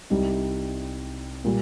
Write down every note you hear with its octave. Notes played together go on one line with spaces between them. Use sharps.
C2 C3 G3 D#4
A#2 G3